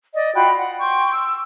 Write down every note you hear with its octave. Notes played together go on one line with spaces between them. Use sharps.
D5 D#5
F4 F#4 G5 B5
F#5
G5 C6 C#6
E6